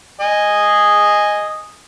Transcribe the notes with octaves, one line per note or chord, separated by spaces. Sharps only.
D#5 G#5 D#6